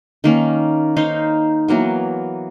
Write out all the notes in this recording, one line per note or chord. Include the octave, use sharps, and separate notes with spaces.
D#3 A#3 C#4
D#4 C5 C#5 F5
E3 F#3 A#3 B3